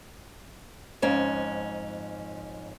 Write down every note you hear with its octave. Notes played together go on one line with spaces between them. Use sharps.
F2 G#2 C#4